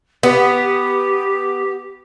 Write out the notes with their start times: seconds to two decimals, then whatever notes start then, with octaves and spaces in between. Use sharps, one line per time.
0.23 B3 G4